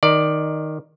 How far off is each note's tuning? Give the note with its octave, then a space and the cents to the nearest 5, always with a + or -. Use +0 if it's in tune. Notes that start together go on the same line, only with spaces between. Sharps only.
D#3 +0 D5 +10